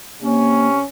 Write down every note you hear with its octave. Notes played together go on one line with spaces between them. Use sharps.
C3 A#3 C#4